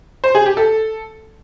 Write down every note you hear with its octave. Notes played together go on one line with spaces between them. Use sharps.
C5
G#4
G4
A4